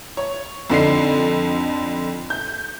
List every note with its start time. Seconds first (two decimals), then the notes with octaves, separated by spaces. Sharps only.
0.17 C#5
0.70 F2 D3 D#4 C7
2.30 G6